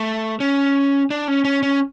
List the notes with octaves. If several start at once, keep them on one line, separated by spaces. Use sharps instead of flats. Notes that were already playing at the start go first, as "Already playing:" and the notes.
Already playing: A3
C#4
D4
C#4
C#4
C#4